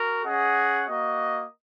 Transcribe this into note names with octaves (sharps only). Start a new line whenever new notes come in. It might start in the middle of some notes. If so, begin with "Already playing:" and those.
Already playing: F#4 A#4
C#4 G#4 D#5 F#5
A#3 F#4 D#5